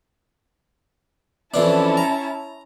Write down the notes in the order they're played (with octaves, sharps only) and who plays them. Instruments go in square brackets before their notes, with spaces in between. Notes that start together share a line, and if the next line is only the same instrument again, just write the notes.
[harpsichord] F2 E3 D4 [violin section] C#4 E4 A5
[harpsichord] A#5